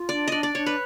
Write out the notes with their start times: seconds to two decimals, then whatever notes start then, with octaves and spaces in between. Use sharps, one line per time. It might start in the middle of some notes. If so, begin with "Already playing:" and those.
Already playing: F4
0.09 D4 D5
0.28 D4 D5 D#5
0.43 D5
0.55 D4 C#5
0.66 B4